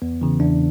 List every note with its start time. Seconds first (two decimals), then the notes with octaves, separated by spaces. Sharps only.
0.02 E2 B3
0.21 C#3 E3
0.40 E2 D4